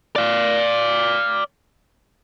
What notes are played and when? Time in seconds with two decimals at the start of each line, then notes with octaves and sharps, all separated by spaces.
0.16 D5 F5